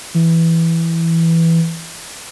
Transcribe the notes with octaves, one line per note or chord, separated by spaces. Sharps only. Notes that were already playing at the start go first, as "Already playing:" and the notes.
E3